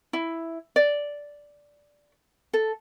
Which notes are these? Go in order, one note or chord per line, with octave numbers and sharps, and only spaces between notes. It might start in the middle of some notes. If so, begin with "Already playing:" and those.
E4
D5
A4